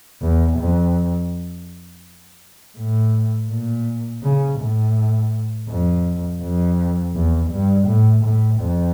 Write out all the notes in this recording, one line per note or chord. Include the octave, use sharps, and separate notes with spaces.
E2
F2
A2
A#2
C#3
A2
F2
F2
E2
G2
A2
A2
F2